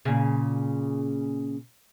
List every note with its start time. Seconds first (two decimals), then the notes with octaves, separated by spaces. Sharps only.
0.05 A#2 C#3